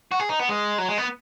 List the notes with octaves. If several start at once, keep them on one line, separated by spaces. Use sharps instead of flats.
F#4
G#4
D#4
B3
G#3
F#3
G#3
B3